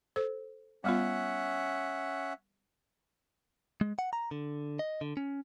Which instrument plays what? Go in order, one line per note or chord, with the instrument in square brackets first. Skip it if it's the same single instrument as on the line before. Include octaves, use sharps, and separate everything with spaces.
[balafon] A4 C5
[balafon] G3 B3 F4 [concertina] C#4 E5 F#5
[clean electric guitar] G#3
F#5
A#5
D3
D#5
D3
C#4